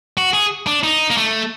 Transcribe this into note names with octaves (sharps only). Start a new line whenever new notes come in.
F#4
G#4
D4
D#4
A#3
A3